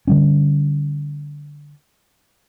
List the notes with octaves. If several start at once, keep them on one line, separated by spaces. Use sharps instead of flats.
D3 G3 C#4